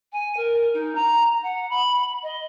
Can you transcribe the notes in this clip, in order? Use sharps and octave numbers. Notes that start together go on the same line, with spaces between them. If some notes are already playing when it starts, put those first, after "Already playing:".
G#5
A#4
D#4
A#5
F#5
B5
D#5